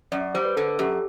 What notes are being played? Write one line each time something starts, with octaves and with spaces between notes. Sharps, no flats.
F#2 D5
G3 C5
B4
D3 A4
A4
F#2 G4